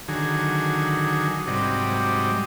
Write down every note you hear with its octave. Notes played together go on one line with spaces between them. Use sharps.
D3 D#3 F#3 G#4
G#2 C3 F#3 G3 D5 D#5